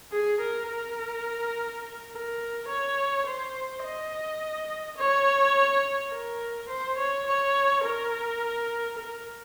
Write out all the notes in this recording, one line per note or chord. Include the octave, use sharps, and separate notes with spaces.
G#4
A#4
A#4
A#4
C#5
C5
D#5
C#5
A#4
C5
C#5
C#5
A#4
A#4